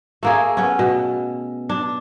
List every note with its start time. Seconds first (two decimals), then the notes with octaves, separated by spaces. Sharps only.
0.23 A3 A#3 G#4
0.57 B3 C#4
0.79 B2
1.69 D4